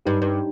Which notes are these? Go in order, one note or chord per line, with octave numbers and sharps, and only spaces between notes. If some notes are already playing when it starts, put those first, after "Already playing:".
G2 D#4 G4
G2